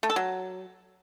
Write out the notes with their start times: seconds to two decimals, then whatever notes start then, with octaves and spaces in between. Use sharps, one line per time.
0.03 A3
0.10 A4
0.16 F#3